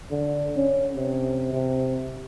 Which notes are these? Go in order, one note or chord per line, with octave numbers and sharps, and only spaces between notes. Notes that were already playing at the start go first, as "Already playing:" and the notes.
D3
C#4
C3
C3